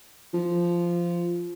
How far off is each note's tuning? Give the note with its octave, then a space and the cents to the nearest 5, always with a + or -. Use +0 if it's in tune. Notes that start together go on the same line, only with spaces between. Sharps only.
F3 -10